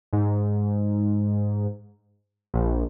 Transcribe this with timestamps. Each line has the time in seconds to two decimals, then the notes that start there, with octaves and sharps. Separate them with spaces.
0.13 G#2
2.54 A#1